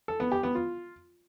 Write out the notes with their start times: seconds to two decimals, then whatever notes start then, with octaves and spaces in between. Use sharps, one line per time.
0.08 A4
0.20 B3
0.32 G4
0.43 B3
0.55 F4